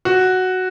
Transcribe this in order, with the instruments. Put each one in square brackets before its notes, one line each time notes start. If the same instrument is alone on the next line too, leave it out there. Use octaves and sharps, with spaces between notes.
[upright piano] F#4